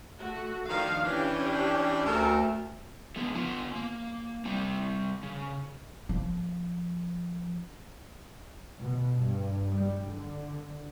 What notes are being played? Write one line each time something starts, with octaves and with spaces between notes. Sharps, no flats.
A3 F#4
D#3 F3 D4 F5
E3 C#4 D4 G4
D2 A3 A4 A#4
D3 F3 G#3 B3
B3 F4
A#3
G3 C4
C#3
F3 A#3
B2
G2
G3
D3